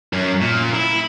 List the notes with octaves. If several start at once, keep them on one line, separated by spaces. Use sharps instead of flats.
F#2
A#2
E4